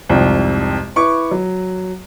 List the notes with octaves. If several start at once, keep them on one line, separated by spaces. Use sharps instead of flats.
C2 F2 G#2
E4 B4 C#6 D6
F#3